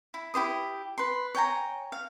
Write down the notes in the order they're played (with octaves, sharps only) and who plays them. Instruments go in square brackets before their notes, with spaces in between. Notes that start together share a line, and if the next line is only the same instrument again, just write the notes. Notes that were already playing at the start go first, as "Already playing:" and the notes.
[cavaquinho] E4
E4 G4 C5 D#6
B4 C6
C#5 G5 G#5 A#5
F5